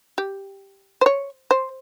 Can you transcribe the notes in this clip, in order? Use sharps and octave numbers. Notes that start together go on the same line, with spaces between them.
G4
C5
C#5
C5